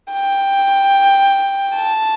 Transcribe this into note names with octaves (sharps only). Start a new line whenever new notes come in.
G5
A5